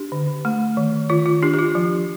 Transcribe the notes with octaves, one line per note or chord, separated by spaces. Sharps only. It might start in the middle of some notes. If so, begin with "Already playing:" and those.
Already playing: D4 G4
D3
A3
D#3
D#3 F4
F4
D4 G4
G4
F4
F3